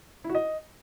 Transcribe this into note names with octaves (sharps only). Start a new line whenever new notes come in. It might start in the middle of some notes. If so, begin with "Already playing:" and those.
E4
F#4
D#5